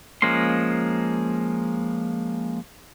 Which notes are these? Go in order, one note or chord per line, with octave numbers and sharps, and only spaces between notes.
F3 G#3 A#3 C#4 C6